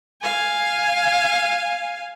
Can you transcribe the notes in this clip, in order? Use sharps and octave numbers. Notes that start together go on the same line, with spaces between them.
F5 G#5